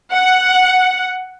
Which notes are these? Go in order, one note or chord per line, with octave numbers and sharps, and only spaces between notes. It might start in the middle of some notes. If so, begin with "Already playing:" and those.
F#5